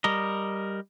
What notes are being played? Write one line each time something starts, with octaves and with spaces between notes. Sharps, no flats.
G3 A#4 D#5